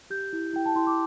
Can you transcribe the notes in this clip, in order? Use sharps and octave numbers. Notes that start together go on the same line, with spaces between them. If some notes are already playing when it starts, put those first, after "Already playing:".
G4 G6
E4
E4 G5
A5
E4 C6
D6